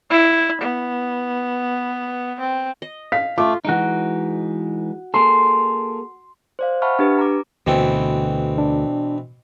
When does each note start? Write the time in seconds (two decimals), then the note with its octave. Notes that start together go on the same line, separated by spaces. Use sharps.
0.10 E4
0.62 B3
2.40 C4
2.82 D#5
3.12 F5 B6
3.38 A3 F4 A4 D6
3.65 E3 G#3 D#4 F#4 D7
5.14 A#3 G#4 A4 C6
6.59 C5 D5 F5
6.82 E5 F#5 A5 B5 C#6 F6
6.99 D4 G4 B4
7.19 A#5 D6
7.67 D2 B2 D3 E3 C4
8.58 D4